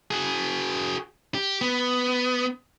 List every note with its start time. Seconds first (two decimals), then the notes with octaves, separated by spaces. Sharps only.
0.11 F#4 G#4
1.35 G4
1.61 B3